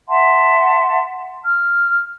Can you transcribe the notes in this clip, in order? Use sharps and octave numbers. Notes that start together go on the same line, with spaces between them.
E5 F#5 A5 C6
F6